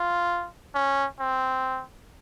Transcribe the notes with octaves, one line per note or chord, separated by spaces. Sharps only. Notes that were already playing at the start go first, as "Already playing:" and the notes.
Already playing: F4
C#4
C4